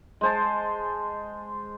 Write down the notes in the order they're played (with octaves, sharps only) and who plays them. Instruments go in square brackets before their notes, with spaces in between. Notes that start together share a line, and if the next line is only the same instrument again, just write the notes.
[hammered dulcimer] G#3 C5 A5